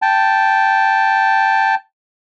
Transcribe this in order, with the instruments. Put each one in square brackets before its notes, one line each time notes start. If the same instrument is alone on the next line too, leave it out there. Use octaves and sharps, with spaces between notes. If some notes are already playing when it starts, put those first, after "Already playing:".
[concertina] G5 A5